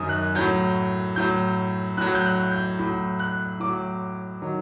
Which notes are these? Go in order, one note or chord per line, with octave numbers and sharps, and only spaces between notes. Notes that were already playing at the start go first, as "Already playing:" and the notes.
Already playing: F#2 D#3 F#3 D#6
F#6
A2 F#3 G6
A2 F#3 G6
A2 F#3 F#6
G6
F#6
G6
A2 F#3
F#6
A2 F#3 D6
D#3 F#3